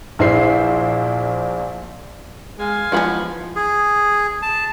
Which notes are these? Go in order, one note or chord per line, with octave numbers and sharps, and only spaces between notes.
A#1 E4 C5 C7
G#3 F5 G#5
E3 F3 G#3 B3 D#4 F#5 B5
G#4
A5